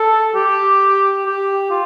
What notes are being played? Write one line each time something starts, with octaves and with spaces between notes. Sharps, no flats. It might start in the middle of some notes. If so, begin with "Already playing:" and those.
Already playing: A4
G4
G4
F4